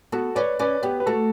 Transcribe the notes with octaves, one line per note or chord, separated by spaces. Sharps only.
B3 F#4 A4
C#4 B4 D5
C#4 B4 D5
B3 G4 B4
B4
A3 F#4 A4